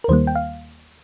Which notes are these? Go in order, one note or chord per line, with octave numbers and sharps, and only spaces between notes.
A#4
D#2 D#3 G3 A#3 C5
G5
F5